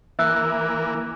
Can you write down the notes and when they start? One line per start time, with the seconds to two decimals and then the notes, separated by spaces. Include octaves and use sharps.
0.19 E3 A#3 E5 E6 F#6